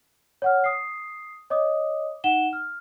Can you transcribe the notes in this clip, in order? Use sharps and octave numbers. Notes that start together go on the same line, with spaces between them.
C#5 F#5 F6
D#6 C7
C#5 D#5 D6 D#6
D#4 F#5 E7 G7
F6